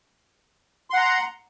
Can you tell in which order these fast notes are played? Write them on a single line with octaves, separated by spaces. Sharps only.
C6 F#5 A#5